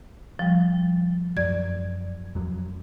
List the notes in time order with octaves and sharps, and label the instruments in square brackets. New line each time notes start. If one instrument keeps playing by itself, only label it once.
[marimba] F3 G3
[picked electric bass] F#2 F#3 [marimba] D5 G#6
[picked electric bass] F2 F#3